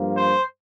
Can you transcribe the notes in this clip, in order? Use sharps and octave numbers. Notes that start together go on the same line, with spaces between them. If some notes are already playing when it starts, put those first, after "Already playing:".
Already playing: G2 F3 A#3
C5